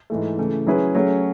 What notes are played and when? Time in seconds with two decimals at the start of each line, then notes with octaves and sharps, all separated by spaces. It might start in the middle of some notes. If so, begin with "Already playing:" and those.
0.10 G#2 E3 A3
0.38 C#3 E3 A3
0.67 F#3 C#4 E4 G#4 B4
0.95 F#3 A3 C#4 G#4